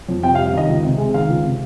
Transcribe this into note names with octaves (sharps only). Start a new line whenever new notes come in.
F2
C3 G5
F5
G3
F5
D#3 D#5
C#2
C3
G#3
D#3 F5
C#2
C3